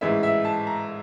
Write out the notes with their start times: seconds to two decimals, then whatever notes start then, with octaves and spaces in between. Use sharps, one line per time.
0.01 A1 G#2 E3 E5
0.23 E5
0.45 A5
0.67 A#5